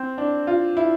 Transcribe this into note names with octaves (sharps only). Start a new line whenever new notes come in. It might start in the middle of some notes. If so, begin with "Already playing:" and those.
Already playing: C4
D4
F4
E4